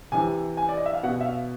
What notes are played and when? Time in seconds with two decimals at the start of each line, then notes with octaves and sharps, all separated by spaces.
0.12 C3 E3 G#5
0.57 G#5
0.69 D5
0.77 D#5
0.86 E5
0.94 F5
1.03 B2 F#5
1.21 E5
1.25 F5